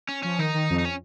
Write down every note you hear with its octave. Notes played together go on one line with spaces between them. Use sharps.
C#4
F3 C#4
D#3 D#4
D#3
F2
D#4
C#4